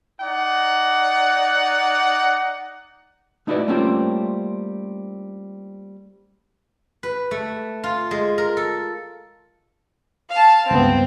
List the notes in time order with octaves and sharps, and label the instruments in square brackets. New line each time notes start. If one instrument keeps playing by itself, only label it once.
[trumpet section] D#4 D5 F#5
[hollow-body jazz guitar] A3 D#4 E4 F#4 B4 D5
G3 A3 A#3 C4 C#4 F4
[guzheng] B4
A3
F4
G#3
A#4
A4
[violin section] F5 A5
[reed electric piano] C#2 G2 B3 [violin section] C4